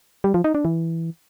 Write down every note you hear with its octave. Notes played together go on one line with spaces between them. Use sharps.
G3
F3
D#4
D4
E3